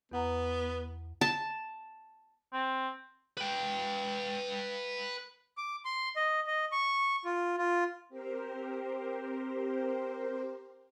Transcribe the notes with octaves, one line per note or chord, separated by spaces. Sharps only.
E2 B3 F#5 A#5
A5
C4
B4 G5
D6
C6
D#5
D#5
C#6
F4
F4
C4 G4 A#4 C5